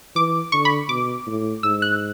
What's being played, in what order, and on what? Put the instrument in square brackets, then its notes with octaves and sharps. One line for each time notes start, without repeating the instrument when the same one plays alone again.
[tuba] E3 [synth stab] D6
[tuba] D3 [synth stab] C#6
[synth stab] B5
[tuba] B2 [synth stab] D6
[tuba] A2
[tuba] G#2 [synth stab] E6
[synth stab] F#6